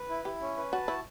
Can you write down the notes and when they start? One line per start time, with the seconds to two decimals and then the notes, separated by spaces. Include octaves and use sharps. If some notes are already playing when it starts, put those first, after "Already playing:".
Already playing: B4
0.09 E4
0.25 E4 G4
0.41 C#4
0.57 B4
0.72 F#4 A5
0.88 E4 F#4